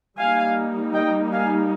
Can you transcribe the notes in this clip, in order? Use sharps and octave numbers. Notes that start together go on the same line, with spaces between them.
G3 A#3 D#4 F5 G#5
D#5 G5
F5 G#5